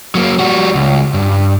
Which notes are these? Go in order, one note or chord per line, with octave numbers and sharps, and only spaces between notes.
F#3 A#3
G3 F#4
C#2
G2